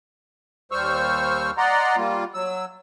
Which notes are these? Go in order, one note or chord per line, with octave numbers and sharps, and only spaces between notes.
D#2 G3 C5 C#6 E6 F6
D5 D#5 F#5 A#5 C6
G3 A#3 F4
F#3 E6